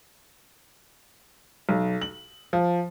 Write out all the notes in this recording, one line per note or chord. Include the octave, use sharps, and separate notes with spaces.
B1
F#7
F3